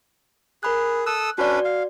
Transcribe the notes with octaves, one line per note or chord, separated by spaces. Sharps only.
G#4 A#4 B5 F#6
A4 D#6 E6 F#6
C#4 D4 F#4 B4 D5
F5